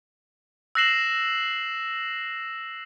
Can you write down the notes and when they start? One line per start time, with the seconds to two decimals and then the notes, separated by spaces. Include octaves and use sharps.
0.75 E6 F#6 A#6 C7 E7 F#7